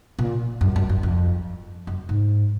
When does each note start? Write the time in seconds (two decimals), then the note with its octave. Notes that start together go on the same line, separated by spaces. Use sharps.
0.19 A#2
0.61 F#2
0.76 F#2
0.89 F#2
1.03 F2
1.87 F#2
2.09 G#2